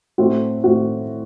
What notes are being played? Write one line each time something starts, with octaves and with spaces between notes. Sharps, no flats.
A2 A3 C4 F#4
A2 A3 C4 F#4